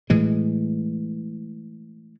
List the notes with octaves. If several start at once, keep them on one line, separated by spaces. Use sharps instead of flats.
A2 E3 G#3